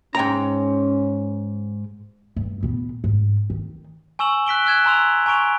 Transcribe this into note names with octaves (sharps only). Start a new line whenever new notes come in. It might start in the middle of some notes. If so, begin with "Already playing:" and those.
G#2 C#4 G5 A#5
G2
A#2 B3
G#2
D#3
G#5 C#6 E6 E7 F#7
F#6 B6 D7 G7
E6 F#6 G#6 E7
G#5 A#5 C6 E6 F7
G#5 A#5 C#6 D7 F7